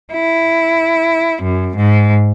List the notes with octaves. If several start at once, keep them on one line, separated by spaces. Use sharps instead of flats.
E4
F#2
G#2